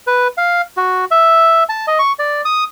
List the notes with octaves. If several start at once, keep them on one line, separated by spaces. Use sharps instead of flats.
B4
F5
F#4
E5
A5
D#5
C#6
D5
D#6